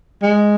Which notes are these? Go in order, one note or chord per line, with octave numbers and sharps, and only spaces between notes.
G#3